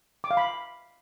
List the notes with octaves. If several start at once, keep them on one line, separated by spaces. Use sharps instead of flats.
D6
F5
B5